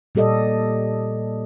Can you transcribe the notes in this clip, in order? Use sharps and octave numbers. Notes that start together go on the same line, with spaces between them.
A#2 G3 G4 A4 D5 D#5